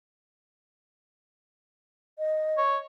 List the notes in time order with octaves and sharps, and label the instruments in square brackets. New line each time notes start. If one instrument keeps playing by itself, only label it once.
[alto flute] D#5
[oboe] C#5